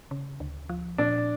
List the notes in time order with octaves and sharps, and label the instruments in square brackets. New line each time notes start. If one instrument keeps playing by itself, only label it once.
[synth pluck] C#3
D2
F3
[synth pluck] A#2 [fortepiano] D4